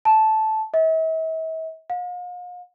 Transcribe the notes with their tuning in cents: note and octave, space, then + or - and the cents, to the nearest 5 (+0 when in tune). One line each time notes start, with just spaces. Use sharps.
A5 -10
E5 -45
F5 +40